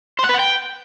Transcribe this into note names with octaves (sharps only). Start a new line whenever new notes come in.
C5
F#5
B4
F#5
G5